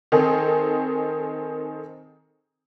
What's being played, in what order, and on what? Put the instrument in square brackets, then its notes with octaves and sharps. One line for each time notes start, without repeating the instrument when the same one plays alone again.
[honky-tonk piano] D#3 C4 D#4 G#4 A4